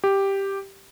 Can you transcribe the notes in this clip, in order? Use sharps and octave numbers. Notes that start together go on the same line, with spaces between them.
G4